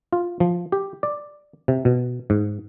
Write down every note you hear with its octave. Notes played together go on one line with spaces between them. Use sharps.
F4
F3
G4
D5
C3
B2
G#2